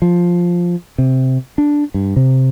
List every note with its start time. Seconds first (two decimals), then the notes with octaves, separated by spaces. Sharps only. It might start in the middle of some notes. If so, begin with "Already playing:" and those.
0.02 F3
0.98 C3
1.58 D4
1.94 G2
2.16 C3